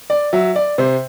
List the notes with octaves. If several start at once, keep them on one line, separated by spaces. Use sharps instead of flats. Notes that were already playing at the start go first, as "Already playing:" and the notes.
D5
F#3 E5
D5
C3 C5